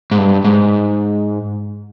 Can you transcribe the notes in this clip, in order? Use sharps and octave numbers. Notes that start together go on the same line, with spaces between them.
G#2
G2
G#2